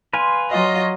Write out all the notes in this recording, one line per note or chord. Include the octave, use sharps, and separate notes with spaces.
B4 F5 G#5 C6
F#3 F4 D#5